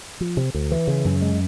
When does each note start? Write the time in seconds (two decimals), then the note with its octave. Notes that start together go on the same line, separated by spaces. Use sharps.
0.20 F3
0.37 C3
0.54 D2
0.71 E3
0.87 C#3
1.05 F#2
1.22 G#3